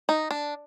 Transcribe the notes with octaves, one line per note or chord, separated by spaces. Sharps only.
D#4
D4